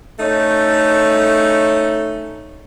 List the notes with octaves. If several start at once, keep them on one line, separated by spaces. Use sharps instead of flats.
A3 C#4 D#4